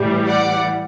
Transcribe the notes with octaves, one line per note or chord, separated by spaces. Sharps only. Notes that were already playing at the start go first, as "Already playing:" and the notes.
Already playing: A2 E3 G3
D5 F#5